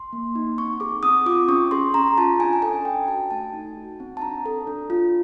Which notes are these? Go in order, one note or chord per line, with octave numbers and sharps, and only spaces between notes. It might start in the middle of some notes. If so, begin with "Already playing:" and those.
Already playing: C6
A#3
D#4
C4 C#6
G#4 D6
C4 D#6
F4 D6
C#4 C#6
G#4 C6
C#4 A#5
F4 A5
D4 G#5
A5
A4 G#5
D4 G5
F#4 A5
A3 A5
D#4
F#4
C4
A5
D4 A#5
A4
D4
F4